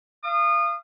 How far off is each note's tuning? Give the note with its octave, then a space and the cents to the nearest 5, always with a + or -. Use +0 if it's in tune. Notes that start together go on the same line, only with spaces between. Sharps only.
F5 -35 D#6 -30